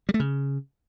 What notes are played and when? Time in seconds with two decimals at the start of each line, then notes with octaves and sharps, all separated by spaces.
0.09 G3
0.14 A3
0.20 C#3